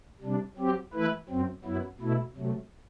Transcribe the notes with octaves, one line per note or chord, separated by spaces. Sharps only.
C3 G3 D4
F#3 C4 G4
E3 A3 E4 B4
F#2 F#3 C4
F#2 F#3 B3 E4
B2 A3 E4
C3 F#3 A3